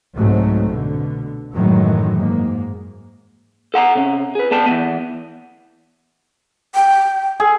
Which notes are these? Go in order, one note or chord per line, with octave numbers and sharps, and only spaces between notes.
C2 G#2 F#3 A3 C4
B2 D3
F#2 A2 D#3 E3 F#3 G#3
G#2 A#3
A4 F#5 A5 A#5
C3 C#4
G#4 B4
B3 A4 D5 G5 A5
E3 F3 B3
G5
G#4 A4